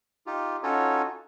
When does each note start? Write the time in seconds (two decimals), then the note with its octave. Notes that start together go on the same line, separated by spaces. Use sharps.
0.26 D#4 F4 G4
0.63 C#4 D#4 F4 F#4 A4 C#5